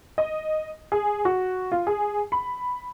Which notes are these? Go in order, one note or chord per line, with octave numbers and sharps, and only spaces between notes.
D#5
G#4
F#4
F4
G#4
B5